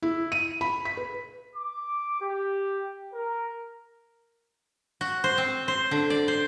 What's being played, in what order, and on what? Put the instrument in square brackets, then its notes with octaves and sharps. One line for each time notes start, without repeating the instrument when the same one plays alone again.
[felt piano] E4
D#7
B5
B6
B4
[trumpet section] D6
G4
A#4
[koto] F#4
C5
C4
C5
D3
D5
C5